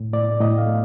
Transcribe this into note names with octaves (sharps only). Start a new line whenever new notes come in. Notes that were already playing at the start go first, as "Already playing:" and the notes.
Already playing: A2
A2 D5
A2 D#5
F5
A3